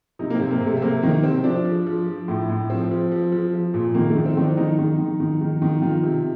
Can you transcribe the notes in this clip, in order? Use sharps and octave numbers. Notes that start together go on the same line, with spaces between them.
C3 D#4
A#3
C3 C4
A#3
C3
A3
C4
C3 A#3
D#3 A#3
C3 C4
F3 D4
F3
F3
F3
A2
A2
F3 C4
F3
F3
F3
F3
A#2
D#3 A#3
A3
D#3
C4
D#3 D4
D#3 D#4
D#3
D#3
D#3
D#3
D#3
D#3 F4
C3